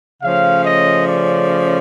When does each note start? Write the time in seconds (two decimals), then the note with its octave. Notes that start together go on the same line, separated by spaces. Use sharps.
0.22 C#3 F3 A3 C#4 F5
0.64 D#5
1.06 D5